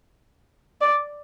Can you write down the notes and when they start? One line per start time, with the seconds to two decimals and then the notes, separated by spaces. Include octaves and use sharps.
0.81 D5